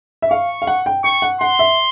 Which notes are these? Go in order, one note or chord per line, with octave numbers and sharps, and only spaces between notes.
E5
F5 C#6
F5
F#5
G5
G5 C#6
F#5
F#5 C6
E5